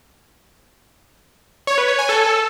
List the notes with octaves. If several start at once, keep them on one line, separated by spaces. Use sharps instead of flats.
C#5
B4
C#5
G#5
A4